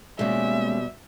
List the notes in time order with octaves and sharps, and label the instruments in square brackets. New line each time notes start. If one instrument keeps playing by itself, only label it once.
[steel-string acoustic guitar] B2 F3 G3 [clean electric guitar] G#3 A#3 C#4 [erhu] E5